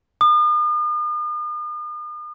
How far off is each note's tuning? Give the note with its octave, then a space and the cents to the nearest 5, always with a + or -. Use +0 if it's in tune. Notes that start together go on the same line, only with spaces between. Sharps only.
D#6 -45